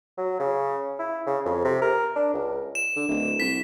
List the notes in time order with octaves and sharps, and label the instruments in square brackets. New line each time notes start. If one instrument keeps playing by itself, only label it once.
[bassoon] F#3
C#3
E4
C#3
F2
C3
A#4
D4
C#2
[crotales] E7
[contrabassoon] D3
D1
[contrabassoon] C2 [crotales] B6